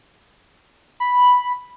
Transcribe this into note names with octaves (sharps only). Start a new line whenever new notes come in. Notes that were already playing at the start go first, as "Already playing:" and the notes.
B5